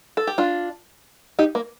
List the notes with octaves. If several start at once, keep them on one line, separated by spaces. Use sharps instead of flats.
A4
G4
D4 F4
D#4 G4
A#3